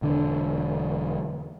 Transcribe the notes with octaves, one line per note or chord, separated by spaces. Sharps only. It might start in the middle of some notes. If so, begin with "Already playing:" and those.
E1 D3 D4